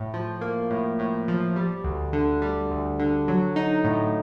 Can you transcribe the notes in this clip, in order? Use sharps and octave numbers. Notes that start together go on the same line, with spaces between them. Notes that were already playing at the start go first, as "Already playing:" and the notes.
Already playing: A2
F3
A#3
A2
A2
F3
G3
D2
D3
G3
D2
D3
F#3
D#4
A2